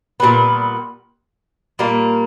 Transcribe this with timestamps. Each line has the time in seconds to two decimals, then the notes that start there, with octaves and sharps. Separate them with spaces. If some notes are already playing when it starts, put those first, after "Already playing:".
0.20 A#2 G3 B3
1.79 A#2 G3 A#3